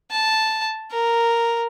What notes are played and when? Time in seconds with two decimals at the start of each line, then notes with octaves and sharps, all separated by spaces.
0.11 A5
0.92 A#4